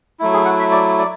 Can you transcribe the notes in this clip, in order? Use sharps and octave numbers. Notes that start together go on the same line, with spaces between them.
F#3 A3 E4
G#4
F#5
E5
D5
D5